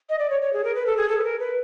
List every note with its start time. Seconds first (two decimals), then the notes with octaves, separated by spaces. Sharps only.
0.10 D#5
0.19 D5
0.30 C#5
0.42 C#5
0.53 G#4
0.64 A#4
0.75 B4
0.86 A4
0.97 G#4
1.09 A4
1.19 B4
1.24 A#4
1.39 B4